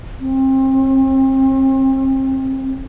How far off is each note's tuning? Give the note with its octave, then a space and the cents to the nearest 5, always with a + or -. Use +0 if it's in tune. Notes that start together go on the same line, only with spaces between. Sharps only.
C4 +30